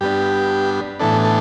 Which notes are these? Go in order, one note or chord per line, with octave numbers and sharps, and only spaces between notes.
G2 G3 B3 D4 G4
A2 E3 B3 D4 A4
A4